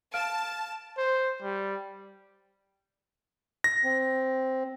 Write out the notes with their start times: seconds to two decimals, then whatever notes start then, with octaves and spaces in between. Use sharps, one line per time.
0.14 F5 A5 F6 D7
0.98 C5
1.42 G3
3.64 A#6
3.84 C4